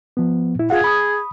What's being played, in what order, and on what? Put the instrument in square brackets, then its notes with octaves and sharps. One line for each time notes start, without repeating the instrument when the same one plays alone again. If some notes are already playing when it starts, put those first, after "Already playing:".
[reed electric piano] F3 B3
A#2 E4
[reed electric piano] F4 F5 F#5 [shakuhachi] G#4
[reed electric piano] B5 D#6